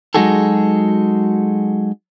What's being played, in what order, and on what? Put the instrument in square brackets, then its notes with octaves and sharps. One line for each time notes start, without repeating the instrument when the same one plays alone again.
[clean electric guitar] F#3 G#3 D#4 F#4 G#4 A4